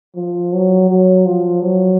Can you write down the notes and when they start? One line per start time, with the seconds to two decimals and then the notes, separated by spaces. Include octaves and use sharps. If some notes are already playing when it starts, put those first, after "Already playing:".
0.15 F3
0.52 F#3
0.89 F#3
1.25 F3
1.63 F#3